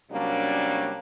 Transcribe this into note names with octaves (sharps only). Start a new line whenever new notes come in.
C3 F#3 G3 A#3 C#4 D4